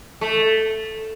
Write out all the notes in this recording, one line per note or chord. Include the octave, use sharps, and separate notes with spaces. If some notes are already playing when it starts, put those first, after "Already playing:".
A3